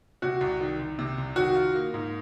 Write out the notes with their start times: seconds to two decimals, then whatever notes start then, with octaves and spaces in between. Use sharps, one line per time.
0.22 C3 F#4
0.41 C2
0.60 D#3
0.79 C2
0.99 C3
1.18 C2
1.36 D#3 F#4
1.56 F4
1.75 A#3
1.94 G#2